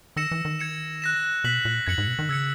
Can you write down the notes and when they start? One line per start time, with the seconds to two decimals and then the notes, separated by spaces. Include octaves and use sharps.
0.16 D#3 E6 A#6 C#7 E7
0.31 E3
0.45 D#3
0.59 G#6 C#7 E7
1.02 F#6 A#6 E7
1.44 B2 F#6 B6 F#7
1.65 A#2
1.87 F#2 G#6 C#7 F#7
1.98 G#2
2.07 B2
2.19 D#3
2.29 C#3 E6 G#6 C#7